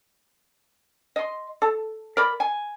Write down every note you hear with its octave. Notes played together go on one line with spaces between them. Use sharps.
D#5 C6
A4
A#4 D5 B5
G#5